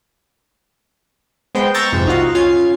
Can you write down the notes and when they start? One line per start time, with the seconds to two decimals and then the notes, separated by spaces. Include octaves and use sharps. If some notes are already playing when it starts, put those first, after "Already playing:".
1.55 G#3 B3 C5 G5
1.74 A#5 C#6 E6 G6 A6 A#6
1.93 F2 G#2 C3
2.06 C2 D#4 F4 F#4 F5
2.35 C#4 F4 F5 G#6 C7